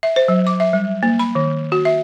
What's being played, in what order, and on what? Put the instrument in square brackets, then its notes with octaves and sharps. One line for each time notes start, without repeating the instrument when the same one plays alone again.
[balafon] E5
C5
F#3
D6
E5
G3
A#3
B5
D#3
F#4
E5